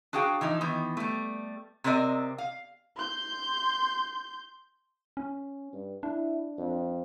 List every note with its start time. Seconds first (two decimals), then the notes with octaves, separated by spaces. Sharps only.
0.13 D4 F#4 G#4 F5 G5
0.41 E3 F3 D#4
0.61 D#3 E3 B3
0.97 G3 A3
1.84 C3 C4 A#4 D5 D#5
2.38 F5
2.96 C6 G6
5.17 C#4
5.73 G2
6.03 D4 E4
6.58 F2